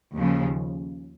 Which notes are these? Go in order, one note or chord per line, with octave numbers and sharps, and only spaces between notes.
D#2 C#3 F3